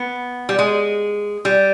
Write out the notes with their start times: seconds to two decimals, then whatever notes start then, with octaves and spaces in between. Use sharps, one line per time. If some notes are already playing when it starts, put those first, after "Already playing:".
Already playing: B3
0.49 G3
0.59 G#3
1.45 G3